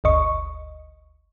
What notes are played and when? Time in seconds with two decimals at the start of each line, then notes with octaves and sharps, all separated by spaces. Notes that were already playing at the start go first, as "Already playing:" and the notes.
0.04 G1 D2 D#5 C#6